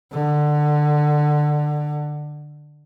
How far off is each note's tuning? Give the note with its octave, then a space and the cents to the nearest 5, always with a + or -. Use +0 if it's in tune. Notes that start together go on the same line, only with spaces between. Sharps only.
D3 +20